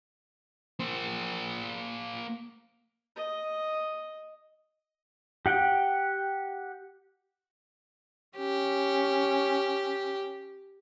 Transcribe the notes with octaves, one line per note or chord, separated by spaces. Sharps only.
A#3 C5
D#5
G4 F#5 G5
C#4 G4